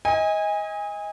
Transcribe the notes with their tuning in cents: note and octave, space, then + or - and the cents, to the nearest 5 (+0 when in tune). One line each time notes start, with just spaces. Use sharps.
D#5 +25 G#5 -25